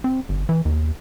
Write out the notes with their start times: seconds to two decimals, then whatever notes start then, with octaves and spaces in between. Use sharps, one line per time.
0.04 C4
0.29 G1
0.49 E3
0.65 D#2